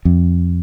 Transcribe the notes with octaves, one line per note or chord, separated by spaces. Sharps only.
F2